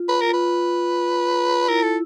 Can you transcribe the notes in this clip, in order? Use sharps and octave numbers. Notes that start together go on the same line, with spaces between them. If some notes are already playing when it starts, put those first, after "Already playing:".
Already playing: F4
B4
A#4
F4
B4
E4 A#4
A4